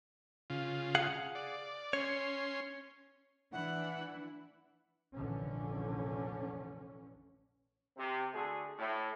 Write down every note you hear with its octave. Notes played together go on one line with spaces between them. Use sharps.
C#3 F4
G#4 F5 F#5
D5
C#4 C#5 C6
E3 D4 E4 F#5
F1 A#1 D3 E3 C#4
C3
D3 A3 F#4 G#4
A2